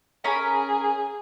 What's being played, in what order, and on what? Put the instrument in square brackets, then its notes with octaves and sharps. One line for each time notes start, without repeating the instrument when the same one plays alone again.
[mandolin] C#4 A#4 B5 [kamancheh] G#4